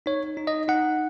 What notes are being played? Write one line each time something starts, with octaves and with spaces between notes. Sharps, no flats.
D#4 C#5
D#4
D#5
D#4 F#5